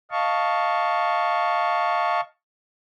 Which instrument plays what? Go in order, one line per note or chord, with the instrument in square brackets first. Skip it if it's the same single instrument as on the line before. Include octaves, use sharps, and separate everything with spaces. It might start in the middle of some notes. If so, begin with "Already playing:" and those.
[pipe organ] D#5 F5 A5 C#6